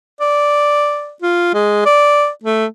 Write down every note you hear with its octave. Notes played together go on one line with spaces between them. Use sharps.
D5
F4
G#3
D5
A3